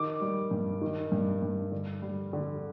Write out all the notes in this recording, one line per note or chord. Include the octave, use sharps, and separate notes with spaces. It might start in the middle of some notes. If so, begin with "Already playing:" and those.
Already playing: D#3 D6
G3
G2
D#3
G2
G2
D3
G3
D3